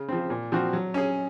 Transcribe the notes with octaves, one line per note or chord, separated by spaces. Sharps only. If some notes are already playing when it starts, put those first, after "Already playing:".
Already playing: C#3
F3 C4
A#2
F3 C4 F#4
F#3
C#4 G#4